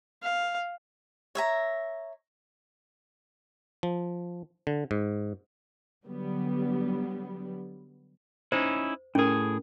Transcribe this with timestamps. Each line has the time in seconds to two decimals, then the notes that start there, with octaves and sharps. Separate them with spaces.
0.23 F5
1.35 C#5 E5 A#5
3.83 F3
4.67 D3
4.91 G#2
6.05 D3 F#3 G3 B3
8.52 C#4 D#4 E4 C5
9.15 A2 C#4 G#4 A#4